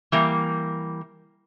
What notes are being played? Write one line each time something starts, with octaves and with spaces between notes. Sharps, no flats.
E3 G3 A#3